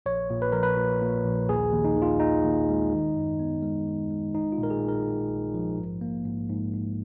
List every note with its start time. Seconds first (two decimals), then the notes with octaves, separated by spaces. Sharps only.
0.06 A#1 C#5
0.30 A#2
0.42 B4
0.52 F3 A#4
0.63 B4
0.77 A#2
1.01 A#2
1.25 A#1
1.49 D#2 G#4
1.72 D#2
1.85 D#4
1.96 D#3
2.02 F4
2.20 D#2 D#4
2.44 D#2
2.68 G#3
2.92 D#3
3.16 F#2
3.39 B3
3.63 G#3
3.87 D#3
4.11 G#3
4.35 A#1 D#4
4.52 F4
4.58 A#2
4.63 A#4
4.70 G#4
4.82 A#1
4.89 A#4
5.06 A#2
5.30 A#1
5.54 F3
5.77 G#2
6.01 A#3
6.25 G#2
6.49 G#2
6.74 G#2